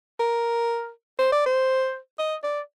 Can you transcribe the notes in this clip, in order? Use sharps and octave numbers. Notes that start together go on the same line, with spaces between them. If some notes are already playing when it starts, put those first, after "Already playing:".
A#4
C5
D5
C5
D#5
D5